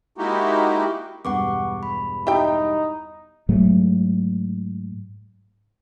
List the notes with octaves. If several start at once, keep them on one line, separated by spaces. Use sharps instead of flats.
G#3 A#3 D#4 E4 F#4 G4
E1 G2 B3 F#5 C#6 D6
B5
D#4 E4 G4 G5
G#2 F#3 A3